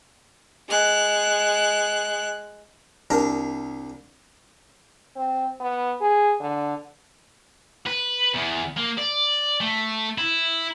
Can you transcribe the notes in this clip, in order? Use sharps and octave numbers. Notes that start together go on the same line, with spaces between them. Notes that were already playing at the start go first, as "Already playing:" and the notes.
G#3 F#6
C2 D4 A#4
C4
B3
G#4
D3
B4
E2
A#3
D5
A3
E4